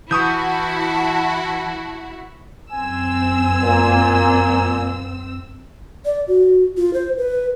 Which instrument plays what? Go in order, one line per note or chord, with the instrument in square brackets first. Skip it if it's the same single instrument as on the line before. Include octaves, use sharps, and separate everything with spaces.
[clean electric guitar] E3 [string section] E4 F#4 [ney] A5 [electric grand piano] C#6 D#6 G6
[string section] F#2 C4 E6 [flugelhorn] G#5
[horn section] A#2
[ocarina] D5
F#4
F4
C5
B4